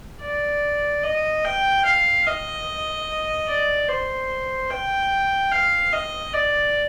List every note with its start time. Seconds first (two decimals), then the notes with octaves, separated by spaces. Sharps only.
0.22 D5
1.03 D#5
1.44 G5
1.85 F5
2.27 D#5
3.48 D5
3.89 C5
4.70 G5
5.51 F5
5.93 D#5
6.33 D5